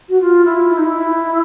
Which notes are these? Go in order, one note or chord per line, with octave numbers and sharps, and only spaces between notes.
F#4
F4
E4
E4
D#4
E4